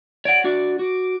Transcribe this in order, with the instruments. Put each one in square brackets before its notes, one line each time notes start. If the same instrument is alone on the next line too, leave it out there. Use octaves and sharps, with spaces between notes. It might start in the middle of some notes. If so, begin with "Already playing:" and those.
[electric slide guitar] C#5 D5 F#5 [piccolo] D7
[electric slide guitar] D4 F#4 D5 [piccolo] D6
[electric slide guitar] F#4 [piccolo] D6